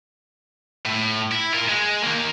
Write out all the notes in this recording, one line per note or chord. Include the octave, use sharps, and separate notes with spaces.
A2
E4
F4 A#4
G#3
D#3 A#3